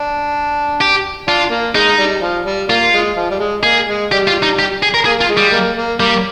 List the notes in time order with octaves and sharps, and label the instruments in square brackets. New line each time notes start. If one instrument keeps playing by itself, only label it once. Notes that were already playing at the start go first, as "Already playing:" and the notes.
Already playing: [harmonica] D4
[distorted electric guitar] G4
[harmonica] D4 [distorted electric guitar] F4
[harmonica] A#3
[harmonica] G#3 [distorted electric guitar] D#4
[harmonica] G3
F3
G3
[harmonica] A#3 [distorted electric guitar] F4
[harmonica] G#3
F3
G3
G#3
[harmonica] A#3 [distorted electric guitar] G#4
[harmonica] G#3
[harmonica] G3 [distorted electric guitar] G4
[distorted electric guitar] F4
D#4
G4
G#4
A#4
[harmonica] A#3 [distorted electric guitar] G#4
[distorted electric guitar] F4
[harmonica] G#3
[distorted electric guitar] G3
[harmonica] A#3
A#3
[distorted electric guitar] G3 [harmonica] A#3